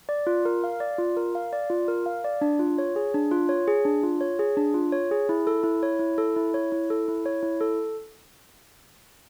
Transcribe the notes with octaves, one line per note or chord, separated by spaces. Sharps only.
D5
F4
A#4
F5
D5
F4
A#4
F5
D5
F4
A#4
F5
D5
D4
F4
C#5
G#4
D4
F4
C#5
G#4
D4
F4
C#5
G#4
D4
F4
C#5
G#4
E4
A4
E4
C#5
E4
A4
E4
C#5
E4
A4
E4
C#5
E4
A4